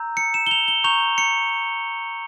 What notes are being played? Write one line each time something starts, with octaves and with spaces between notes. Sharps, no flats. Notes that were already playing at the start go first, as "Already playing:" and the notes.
Already playing: A#5 E6 G6
C#7
E7
G7
F7
G7
A#5 C#6 G6 F7
C#7